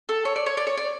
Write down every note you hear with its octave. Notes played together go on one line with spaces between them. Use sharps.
A4
C#5
D5
C#5
D5
C#5
D5